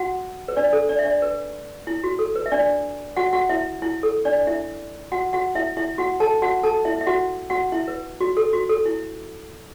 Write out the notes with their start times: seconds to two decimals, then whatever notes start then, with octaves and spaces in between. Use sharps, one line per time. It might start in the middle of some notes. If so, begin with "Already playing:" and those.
Already playing: F#4 F#5
0.48 B4
0.57 D4 D5
0.73 A4
0.89 D4 D5
0.99 E5
1.05 D4 D5
1.22 B4
1.87 E4
2.04 F#4
2.19 A4
2.36 B4
2.46 E5
2.52 D4 D5
3.17 F#4 F#5
3.33 F#4 F#5
3.49 E4 E5
3.82 E4
4.03 A4
4.25 D4 D5
4.47 E4 E5
5.12 F#4 F#5
5.33 F#4 F#5
5.55 E4 E5
5.77 E4 E5
5.98 F#4 F#5
6.20 A4 A5
6.42 F#4 F#5
6.64 A4 A5
6.85 E4 E5
7.01 E5
7.07 F#4 F#5
7.50 F#4 F#5
7.72 E4 E5
7.88 B4
8.21 F#4
8.37 A4
8.53 F#4
8.69 A4
8.86 E4